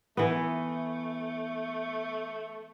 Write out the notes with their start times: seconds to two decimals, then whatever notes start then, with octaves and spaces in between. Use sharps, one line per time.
0.17 E3 A3 B3